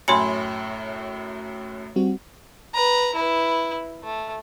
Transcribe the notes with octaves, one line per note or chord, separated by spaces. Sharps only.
F#2 A2 C#5 G#5 B5 C6 C#7
G3 C4 F#4
B4 A#5
E4 B4
A3